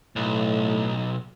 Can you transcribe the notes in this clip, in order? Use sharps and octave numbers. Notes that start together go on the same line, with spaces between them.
B1 A2